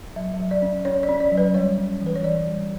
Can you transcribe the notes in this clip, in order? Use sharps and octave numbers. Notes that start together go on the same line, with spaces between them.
F#3 E5
E5
F#3
D5
C#4
C#4 C#5
D5
C#4
D5
F#3
B4
G3 C#5
C#4
E3
B4
C#5
E3 D5
G3